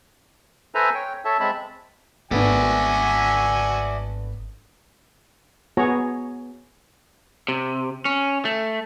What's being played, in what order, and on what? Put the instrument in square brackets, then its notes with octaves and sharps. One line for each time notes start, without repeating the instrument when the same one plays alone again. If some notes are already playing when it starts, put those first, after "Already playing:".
[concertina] A4 B4 C5 E5 G#5 A#5
C#5 G5
A4 C#5 E5 A5
G#3 C4 E5 A5 B5
[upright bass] G#1 [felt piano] A3 B3 D4 [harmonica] F#4 G#5 [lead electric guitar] D5 E5
[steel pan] B3 F#4 G#4 C#5 A#5
[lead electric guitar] C3
C#4
A3